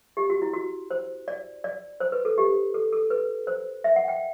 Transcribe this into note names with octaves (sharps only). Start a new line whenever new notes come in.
G4
F#4
E4
F#4
C5
D5
D5
C5
B4
A4
G4
A4
A4
B4
C5
E5
F#5
G5